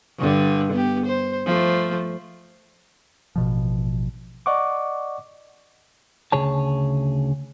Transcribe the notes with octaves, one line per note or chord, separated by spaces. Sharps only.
G2 D3
B3 G4
C5
F3 A3
A1 B2 F3
D5 D#5 F#5 C#6 D6
D2 C#3 G#4 C#5 A5